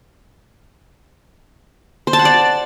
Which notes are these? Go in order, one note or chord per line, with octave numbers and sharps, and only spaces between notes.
C5
A5
F#5
D5